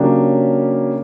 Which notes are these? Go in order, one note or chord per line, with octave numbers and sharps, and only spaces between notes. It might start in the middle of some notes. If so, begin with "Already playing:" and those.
Already playing: C#3 F#3 A#3 D4 G4